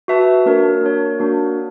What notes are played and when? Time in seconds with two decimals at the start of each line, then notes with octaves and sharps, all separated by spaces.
0.08 F#4 B4 E5 A5
0.46 A#3 D4 F#4 A#4 C#5
0.81 A#3 D4 F#4 A#4 C#5
1.19 A#3 D4 F#4 A#4 C#5